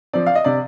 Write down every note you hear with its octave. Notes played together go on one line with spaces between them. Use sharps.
F3 C4 D5
F5
D#5
C3 D5